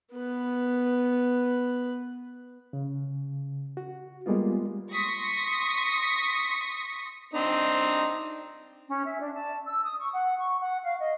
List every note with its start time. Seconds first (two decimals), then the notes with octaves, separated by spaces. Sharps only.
0.13 B3 B4
2.73 C#3
3.77 F#4
4.26 G3 G#3 A#3 B3 F4
4.92 C6 C#6 D#6 A#6 B6 C#7
7.33 C4 D4 D#4
8.89 C#4
9.06 E5
9.20 D4
9.35 A5
9.67 E6
9.84 D#6
10.00 C#6
10.14 F#5
10.39 C#6
10.60 F#5
10.85 F5
10.99 D#5